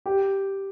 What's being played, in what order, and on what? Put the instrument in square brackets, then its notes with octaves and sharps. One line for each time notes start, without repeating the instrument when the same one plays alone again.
[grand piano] G4